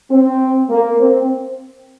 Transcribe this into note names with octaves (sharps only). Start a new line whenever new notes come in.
C4
A#3
C4